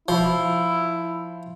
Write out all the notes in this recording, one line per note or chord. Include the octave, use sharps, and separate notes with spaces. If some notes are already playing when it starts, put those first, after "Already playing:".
F3 E4